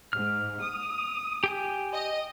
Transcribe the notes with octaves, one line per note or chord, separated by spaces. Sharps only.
G#2 F6
D#6
G4 G5 G#5
D#5